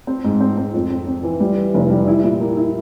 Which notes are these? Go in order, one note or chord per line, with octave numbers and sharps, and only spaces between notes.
C4
G#2
C4
C4
F2
C4
C4
E3
G3
E3
F1
G3
E4
A#2
A#3
E4